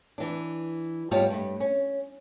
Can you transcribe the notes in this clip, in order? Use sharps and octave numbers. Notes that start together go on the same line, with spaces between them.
E3 D4
G#2 G3 B3 F4 C#5 A5
G2 A3
C#4